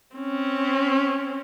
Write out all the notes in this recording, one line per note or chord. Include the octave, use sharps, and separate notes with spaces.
C4 C#4